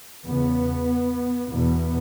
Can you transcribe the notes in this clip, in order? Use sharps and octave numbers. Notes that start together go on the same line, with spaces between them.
E2 C#3 B3
E2 B2 B3